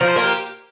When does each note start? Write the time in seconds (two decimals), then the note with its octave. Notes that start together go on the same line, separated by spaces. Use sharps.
0.01 F3 A#4
0.09 C5
0.16 A#3 F4 A#4
0.24 G4